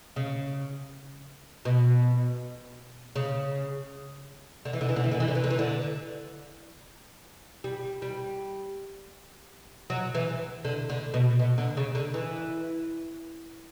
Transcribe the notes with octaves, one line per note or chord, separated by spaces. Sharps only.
C#3
B2
C#3
D3
E3
D3
E3
D3
E3
D3
E3
D3
E3
D3
E3
D3
G3
G3
F#3
E3
D3
D3
B2
B2
D3
C#3
D3
E3